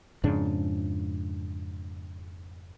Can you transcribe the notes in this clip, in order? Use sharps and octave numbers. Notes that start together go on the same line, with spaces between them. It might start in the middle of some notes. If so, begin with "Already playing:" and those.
F2 G#2 C#3 D4